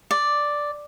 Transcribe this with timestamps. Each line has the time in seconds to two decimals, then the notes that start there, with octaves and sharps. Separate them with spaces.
0.11 D5